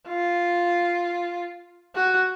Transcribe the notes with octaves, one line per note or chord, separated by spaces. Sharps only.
F4
F#4